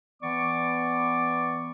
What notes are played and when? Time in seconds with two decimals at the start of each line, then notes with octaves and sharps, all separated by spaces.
0.23 E3 B3 D5 C#6 D6